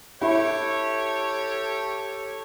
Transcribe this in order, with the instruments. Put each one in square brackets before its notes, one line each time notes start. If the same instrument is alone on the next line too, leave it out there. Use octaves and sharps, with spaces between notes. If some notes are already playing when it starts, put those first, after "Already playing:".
[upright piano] E4 [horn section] G4 A4 C#5